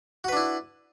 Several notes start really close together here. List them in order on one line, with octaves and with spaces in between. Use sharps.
F#4 B4 D4 E4